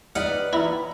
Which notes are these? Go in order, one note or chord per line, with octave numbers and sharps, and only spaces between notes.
D#4 B4 D5 F#5 F6
E4 A#5 B5 E6